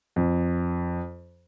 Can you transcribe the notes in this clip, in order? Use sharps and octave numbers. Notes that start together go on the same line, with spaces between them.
F2